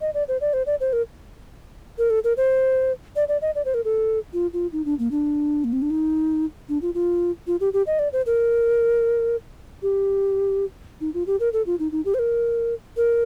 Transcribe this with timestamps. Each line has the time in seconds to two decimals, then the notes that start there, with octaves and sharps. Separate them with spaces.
0.01 D#5
0.14 D5
0.28 C5
0.41 D5
0.53 C5
0.66 D5
0.80 C5
0.93 A#4
1.98 A#4
2.10 A4
2.24 A#4
2.37 C5
3.16 D5
3.28 D5
3.42 D#5
3.55 D5
3.65 C5
3.74 A#4
3.85 A4
4.33 F4
4.53 F4
4.73 D#4
4.85 D4
4.99 A#3
5.11 D4
5.64 A#3
5.73 C4
5.82 D4
5.90 D#4
6.69 D4
6.82 F4
6.94 F4
7.47 F4
7.60 G4
7.73 G4
7.87 D#5
7.99 D5
8.13 C5
8.26 A#4
9.83 G4
11.01 D#4
11.14 F4
11.27 G4
11.40 A#4
11.53 A4
11.66 F4
11.79 D#4
11.92 D#4
12.05 G4
12.14 C5
12.19 A#4
12.97 A#4